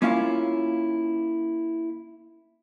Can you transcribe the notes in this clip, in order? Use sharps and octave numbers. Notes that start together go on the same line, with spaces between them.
A#3 C#4 E4 F4 C#5 F5